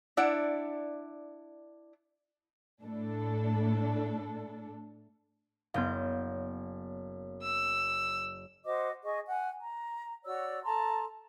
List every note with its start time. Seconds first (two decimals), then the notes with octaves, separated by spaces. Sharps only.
0.17 D4 E4 D5 F#5
2.81 A2 D4 A4
5.74 F#1 B3 C#5 F5 G6
7.42 E6
8.65 F#4 C5 D#5 D6
9.03 G#4 D#5 C#6
9.28 F#5 G#5
9.61 A#5
10.25 F#4 C#5 D5 E6
10.64 A4 A5 A#5 C6